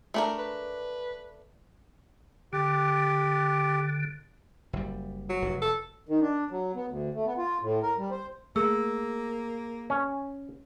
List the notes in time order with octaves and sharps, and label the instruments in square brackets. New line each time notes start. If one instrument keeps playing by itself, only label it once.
[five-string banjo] A3 D4 A#4
[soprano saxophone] B4
[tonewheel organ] D3 [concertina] G4
[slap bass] F#1 G3
[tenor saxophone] F#3
[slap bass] F1 E2
[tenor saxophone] A4
[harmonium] D#3
D4
F#3
B3
D2
A3
B3
F4
A2
A#4
G3
C5
[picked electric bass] A3 [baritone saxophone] A#3 [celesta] G#4 E6
[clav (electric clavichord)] C#4